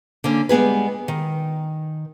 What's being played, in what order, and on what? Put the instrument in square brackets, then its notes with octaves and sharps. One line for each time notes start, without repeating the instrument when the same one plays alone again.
[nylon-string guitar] D3 A#3 C#4
G3 G#3 B3 G#4 B4
D#3